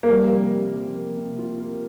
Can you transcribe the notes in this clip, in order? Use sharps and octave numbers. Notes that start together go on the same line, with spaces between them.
A#3
F3 G3
C3
C3
F3
A#3
C3
F4
A#3